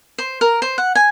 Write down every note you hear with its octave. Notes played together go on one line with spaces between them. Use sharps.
C5
A#4
C5
F#5
G#5